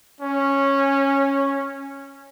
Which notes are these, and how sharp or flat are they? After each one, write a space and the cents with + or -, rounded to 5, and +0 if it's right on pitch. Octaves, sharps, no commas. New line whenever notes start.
C#4 -10